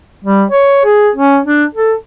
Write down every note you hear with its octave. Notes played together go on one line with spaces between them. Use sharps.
G3
C#5
G#4
C#4
D4
A4